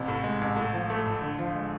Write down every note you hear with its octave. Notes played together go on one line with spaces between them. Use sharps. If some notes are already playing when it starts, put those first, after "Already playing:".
Already playing: A1 C3
A2
G#3
A1
A2
F3
A3
A2
D3
F3
G#3